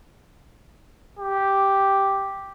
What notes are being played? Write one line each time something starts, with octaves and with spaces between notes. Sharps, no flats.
G4